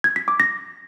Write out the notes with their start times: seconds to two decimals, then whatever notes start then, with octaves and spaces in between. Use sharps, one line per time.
0.04 G#6
0.16 B6
0.28 D6
0.40 A#6